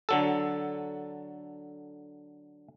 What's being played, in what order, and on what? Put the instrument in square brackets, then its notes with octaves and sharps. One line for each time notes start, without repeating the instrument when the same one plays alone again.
[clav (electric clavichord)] D3 F#3 A4